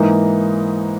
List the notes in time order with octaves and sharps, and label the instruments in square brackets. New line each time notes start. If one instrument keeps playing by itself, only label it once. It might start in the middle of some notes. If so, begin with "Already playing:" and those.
Already playing: [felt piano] G#2 E3 A#3 D#4